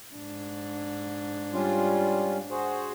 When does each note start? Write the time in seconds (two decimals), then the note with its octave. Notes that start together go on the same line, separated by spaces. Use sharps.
0.14 G#2 D4
1.53 G3 C#4 F4
2.50 F#4 G#4 C5